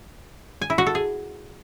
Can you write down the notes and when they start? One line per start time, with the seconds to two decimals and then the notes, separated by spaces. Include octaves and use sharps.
0.61 G#5
0.70 E4
0.78 F#4
0.86 A4
0.95 G#4